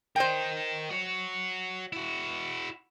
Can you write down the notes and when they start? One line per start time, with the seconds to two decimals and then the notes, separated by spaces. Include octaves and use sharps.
0.16 A#4 C5 D#5 G5
0.91 F#4 C#5
1.93 E4 F#4